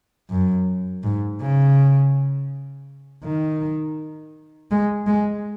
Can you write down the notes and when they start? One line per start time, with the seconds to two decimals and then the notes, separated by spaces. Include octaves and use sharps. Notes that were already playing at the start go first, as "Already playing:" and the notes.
0.30 F#2
1.03 G#2
1.41 C#3
3.24 D#3
4.71 G#3
5.07 G#3